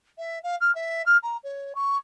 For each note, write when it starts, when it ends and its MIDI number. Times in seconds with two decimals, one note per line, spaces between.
0.18 0.39 76
0.43 0.56 77
0.61 0.74 89
0.75 1.03 76
1.06 1.17 89
1.23 1.37 82
1.44 1.73 73
1.75 1.97 85